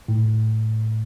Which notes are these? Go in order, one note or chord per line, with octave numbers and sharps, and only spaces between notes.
A2